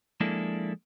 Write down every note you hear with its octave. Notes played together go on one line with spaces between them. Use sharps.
F3 G#3 A#3 D4 E4 A4